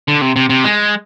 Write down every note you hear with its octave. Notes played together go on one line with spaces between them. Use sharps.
D3
C3
C3
C3
G#3